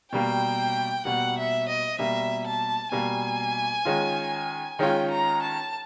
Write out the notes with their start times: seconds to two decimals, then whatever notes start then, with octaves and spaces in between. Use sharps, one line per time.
0.12 B2 G3 A#3 G5
1.05 B2 G3 A#3 F#5
1.36 E5
1.68 D#5
1.99 B2 G3 A#3 E5
2.46 A5
2.92 B2 G3 A#3 G#5
3.85 D#3 G#3 C#4 F4
4.79 D#3 G#3 C#4 F4 G5
5.10 A#5
5.42 A5